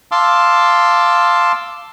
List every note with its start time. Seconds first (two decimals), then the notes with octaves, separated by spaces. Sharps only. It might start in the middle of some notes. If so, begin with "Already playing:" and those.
0.12 F5 A5 C6 D6 E6